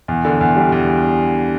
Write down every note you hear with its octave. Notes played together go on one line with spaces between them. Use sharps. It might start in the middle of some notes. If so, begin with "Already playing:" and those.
E2
D3
E2
G3
E2